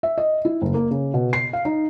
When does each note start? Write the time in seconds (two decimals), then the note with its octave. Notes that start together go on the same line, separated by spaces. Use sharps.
0.03 E5
0.18 D#5
0.45 E4
0.62 F#1
0.74 A#3
0.91 C#3
1.14 B2
1.33 C7
1.53 F5
1.65 D#4